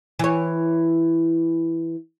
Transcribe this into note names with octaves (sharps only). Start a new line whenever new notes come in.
E3 C#5